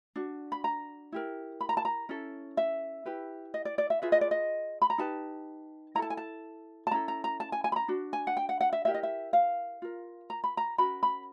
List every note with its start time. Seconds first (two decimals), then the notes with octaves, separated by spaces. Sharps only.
0.16 D4 F#4
0.52 B5
0.64 A#5
1.12 E4 G4 A#4
1.61 B5
1.69 A#5
1.77 A5
1.85 A#5
2.09 C#4 E4 A4
2.57 E5
3.05 E4 G4 B4
3.54 D#5
3.65 D5
3.78 D5
3.90 E5
4.02 F4 G#4 B4 E5
4.12 D#5
4.21 D5
4.31 D#5
4.82 B5
4.90 A#5
4.98 D#4 G4 B4 A5
5.95 E4 A#5
5.99 A4 A5
6.10 G#5
6.17 A5
6.87 A5
6.91 C#4 E4 A4 A#5
7.08 A#5
7.24 A#5
7.40 A5
7.52 G#5
7.64 G#5
7.72 B5
7.76 A#5
7.88 D4 F#4
8.13 G#5
8.27 F#5
8.37 G5
8.49 F#5
8.61 F#5
8.73 E5
8.85 E4 G4 A#4 E5
8.94 D#5
9.03 E5
9.33 F5
9.82 F4 A#4
10.30 A#5
10.44 B5
10.57 A#5
10.78 C#4 F#4 A#4 B5
11.03 B5